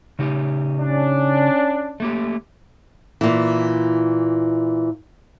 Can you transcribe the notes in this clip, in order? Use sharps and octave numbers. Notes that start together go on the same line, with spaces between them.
C#3 D#4 G4
C#4 D4
A3 A#3 G4
A#2 E3